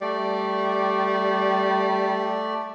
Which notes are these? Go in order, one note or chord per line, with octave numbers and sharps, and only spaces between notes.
G3 A3 D5